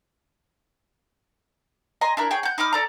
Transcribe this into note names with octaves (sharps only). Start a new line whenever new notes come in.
D#5 G#5 A#5 C6
D4 E4 A#4
G#4 C#5 G5
F#5 G6
D#4 B5 D6 F6
A4 D5 A#5